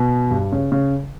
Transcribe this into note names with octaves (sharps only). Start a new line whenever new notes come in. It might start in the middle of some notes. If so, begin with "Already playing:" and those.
Already playing: B2
G2
C#3
C#3